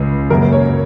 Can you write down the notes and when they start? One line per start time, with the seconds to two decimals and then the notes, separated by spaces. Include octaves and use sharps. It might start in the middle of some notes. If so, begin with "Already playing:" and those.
Already playing: C#2 C#3 G#3
0.30 F#2 C#3 F#3 A#3 C#4 A#4
0.52 C#5